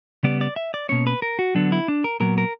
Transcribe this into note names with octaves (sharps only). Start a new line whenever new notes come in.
C#3 G3 B3 D5
D5
E5
D5
B2 A#3 C#4 C#5
B4
A#4
F#4
D3 F#3 B3 D4
E4
D4
A#4
A#2 F#3 B3 A#4
A#4